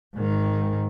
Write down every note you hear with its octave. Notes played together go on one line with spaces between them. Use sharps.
G#2 D#3